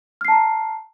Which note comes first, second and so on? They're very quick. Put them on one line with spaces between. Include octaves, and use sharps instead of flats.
F6 C7 A5 A#5